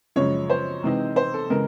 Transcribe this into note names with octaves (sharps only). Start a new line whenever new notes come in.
F#2 C#3 F3 G#3 C#5
C5
C3 E3 G#3 C4 D#4
C5
A4
C#3 E3 G#3 A#4